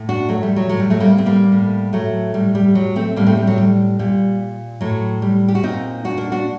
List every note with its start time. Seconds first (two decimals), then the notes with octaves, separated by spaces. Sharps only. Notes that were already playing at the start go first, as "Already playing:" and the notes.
Already playing: A2
0.09 D4 F#4
0.29 F#3 A3
0.43 G3
0.56 F#3
0.69 A2 F#3
0.80 G3
0.90 F#3 A3
1.00 G3 A#3
1.11 A#3
1.18 C4
1.26 G3 A#3
1.52 A2
1.93 F#3 A3
2.34 A2 G3
2.55 G3
2.75 F#3
2.96 A3 C4
3.16 A2 G3 A#3
3.26 A3 C4
3.37 G3
3.47 F#3
3.58 G3
3.99 A#2 G3
4.81 A2 F#3
5.22 G3
5.48 G4
5.55 F#4
5.63 A#2 C4 D#4
6.05 D4 F#4
6.18 A#3 D4
6.32 D4 F#4